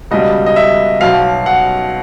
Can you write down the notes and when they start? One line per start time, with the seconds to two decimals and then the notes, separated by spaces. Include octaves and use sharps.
0.11 C#2 B2 G3 D#5
0.46 D#5
0.56 E5
1.01 B1 B2 F#3 F5
1.46 F#5